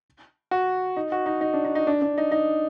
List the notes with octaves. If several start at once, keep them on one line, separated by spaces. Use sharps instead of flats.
F#4
D#4
F#4
D#4
D#4
D4
D#4
D#4
D4
D4
D#4
D#4